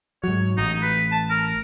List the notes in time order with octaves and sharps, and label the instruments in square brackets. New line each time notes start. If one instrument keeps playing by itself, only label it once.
[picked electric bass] G#2 F#3 [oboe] C#5
[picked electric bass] A1 [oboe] D#4
[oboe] B4
A5
A#4